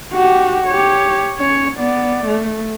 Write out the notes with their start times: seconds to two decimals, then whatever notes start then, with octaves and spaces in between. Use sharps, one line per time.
0.13 F#4 G4
0.68 G4 C#5
1.39 C#4 C#5
1.76 B3 D5
2.26 A3